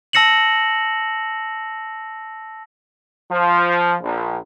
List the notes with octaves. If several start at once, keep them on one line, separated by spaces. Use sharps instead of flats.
A5 E6 A#6 C#7 E7 F#7
F3
A#1